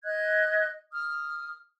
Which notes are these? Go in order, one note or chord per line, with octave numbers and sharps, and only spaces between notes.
D#5 F#6 G#6
D#6 F6